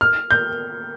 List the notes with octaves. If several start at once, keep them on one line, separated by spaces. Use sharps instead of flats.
F6
G6